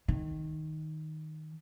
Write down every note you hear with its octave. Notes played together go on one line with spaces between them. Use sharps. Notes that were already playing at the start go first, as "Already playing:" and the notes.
D#3